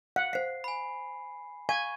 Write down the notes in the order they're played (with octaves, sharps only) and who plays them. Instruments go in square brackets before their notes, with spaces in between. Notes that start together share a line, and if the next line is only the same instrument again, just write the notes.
[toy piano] F5 [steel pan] F#5
[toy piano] C5 F5 [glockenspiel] C7
[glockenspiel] G#5 B5
[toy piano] F5 [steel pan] G#5 [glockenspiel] C#6 G#6 D#7